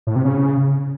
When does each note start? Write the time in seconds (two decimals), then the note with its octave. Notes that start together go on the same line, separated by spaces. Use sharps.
0.07 A2
0.16 C3
0.25 C#3